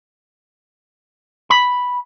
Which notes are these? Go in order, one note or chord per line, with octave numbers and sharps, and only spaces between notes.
B5